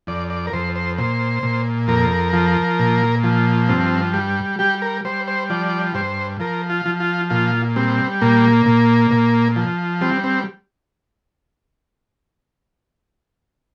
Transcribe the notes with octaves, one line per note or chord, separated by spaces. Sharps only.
F2 D5
D5
A#4
F2 C5
C5
A#2 C5
A#2
F2 A#4
F3
A#2
F3
G2 C4
G3
G3 G4
A#4
G3 C5
C5
F3 D5
G2 C5
F3 A#4
F4
F3
F4
A#2 F4
G3 C4
A#2 A#3
A#2
A#2
F3
G3 C4
C4